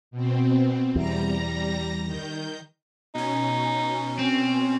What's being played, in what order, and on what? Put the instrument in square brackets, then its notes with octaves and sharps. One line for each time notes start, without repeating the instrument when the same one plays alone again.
[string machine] B2 C4
[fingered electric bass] E2 [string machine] G3 A#5 A#6
[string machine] D#3 G6
[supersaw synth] B2 C#4 [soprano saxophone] D#4
[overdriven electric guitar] C4